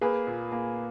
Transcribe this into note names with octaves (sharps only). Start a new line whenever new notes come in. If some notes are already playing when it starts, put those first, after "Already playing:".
A#3 G#4 B4
A#2
A#3